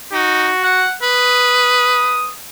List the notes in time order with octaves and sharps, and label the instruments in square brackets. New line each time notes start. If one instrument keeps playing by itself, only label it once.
[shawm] D#4 [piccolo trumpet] F#4
[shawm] F#5
[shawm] B4 [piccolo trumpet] D#6